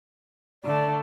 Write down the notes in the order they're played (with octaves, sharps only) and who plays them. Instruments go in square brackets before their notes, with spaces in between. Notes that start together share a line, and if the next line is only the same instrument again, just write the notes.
[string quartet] D3 A3 [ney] D5